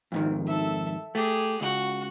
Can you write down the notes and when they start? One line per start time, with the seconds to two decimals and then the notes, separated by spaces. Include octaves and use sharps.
0.12 F2 G#2 D#3
0.47 A4 E5
1.15 A3 G4 G#4
1.61 C#2 F#4